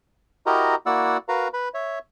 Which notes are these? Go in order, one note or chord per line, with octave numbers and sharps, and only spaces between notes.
E4 F#4 G4 A#4 D#5 A#5
A#3 E4 F#4 D5 F#5 E6
F#4 A#4 B4 F5 A#5
B4 B5
C#5 E5